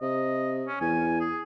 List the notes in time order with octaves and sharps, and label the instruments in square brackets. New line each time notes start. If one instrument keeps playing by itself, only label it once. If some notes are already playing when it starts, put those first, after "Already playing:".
[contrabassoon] C3 [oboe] D#5
[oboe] C#4
[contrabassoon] E2 [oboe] G#5
[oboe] G#4